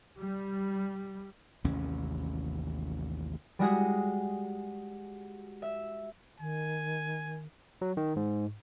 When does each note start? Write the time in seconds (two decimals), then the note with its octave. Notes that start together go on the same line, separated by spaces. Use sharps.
0.19 G3
1.64 A1 D#2 C3 C#4
3.59 G3 G#3 F#4 G#4
5.62 E5
6.40 D#3 G#5
7.82 F#3
7.97 D#3
8.16 G#2